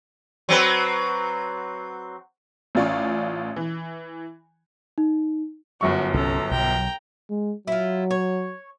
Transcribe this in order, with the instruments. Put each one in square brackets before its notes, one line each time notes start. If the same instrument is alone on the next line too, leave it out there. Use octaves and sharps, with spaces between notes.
[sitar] F#3 C4 B4
[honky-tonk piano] A1 C#4 F4 D5 C#6
E3
[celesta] D#4
[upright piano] G1 F#2 C#6 [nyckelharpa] F#4
[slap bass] C2 C#4 [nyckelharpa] A4 A#5
[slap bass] B1 F#3 [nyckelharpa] G5 A#5
[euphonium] G#3
[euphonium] F#3 [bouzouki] E4 F4
[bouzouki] C#5